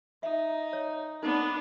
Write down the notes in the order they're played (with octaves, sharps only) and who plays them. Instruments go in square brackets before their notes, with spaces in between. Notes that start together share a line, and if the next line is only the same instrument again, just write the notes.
[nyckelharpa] D#4 [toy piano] E5
[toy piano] C#5
[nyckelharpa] B3 D4 [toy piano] D#4